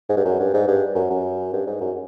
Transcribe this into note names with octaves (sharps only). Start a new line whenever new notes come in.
G#2
G2
F#2
G2
G#2
G2
F#2
F#2
G2
G#2
F#2